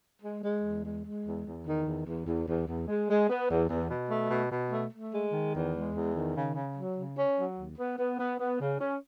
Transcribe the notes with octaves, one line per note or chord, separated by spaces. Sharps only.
G#3
G#3
E2
G#3
G#3
E2
E2
D#3
E2
E2
E2
E2
E2
G#3
G#3
B3
E2
E2
B2
A3
B2
B2
A3
A3
G#3
D#3
E2
G#3
E2
D#3
C#3
C#3
F#3
C#3
C#4
F#3
D#2
B3
B3
B3
B3
C#3
C#4